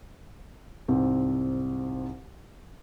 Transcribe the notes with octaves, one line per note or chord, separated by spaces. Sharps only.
C2 G#2 C4